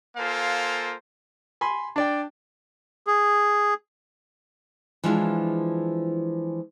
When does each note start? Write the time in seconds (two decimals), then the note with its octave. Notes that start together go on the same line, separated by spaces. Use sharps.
0.17 A#3 F4 A4 C5 F5 G#5
1.61 G#5 B5 C6
1.96 D4 D5 G5
3.07 G#4
5.04 E3 F3 G#3 D4 F4